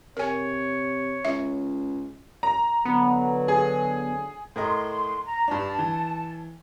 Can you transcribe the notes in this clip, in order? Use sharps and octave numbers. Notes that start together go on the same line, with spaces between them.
C3 A#4 C#5 G#5
C#2 E5
A#5
D3 F#3 B3
G#4
A2 A#4 D#5 C6
A#5
G2 D4 A5
E3